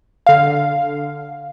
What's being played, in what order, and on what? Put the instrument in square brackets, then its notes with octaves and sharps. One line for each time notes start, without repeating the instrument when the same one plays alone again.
[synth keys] D3 F5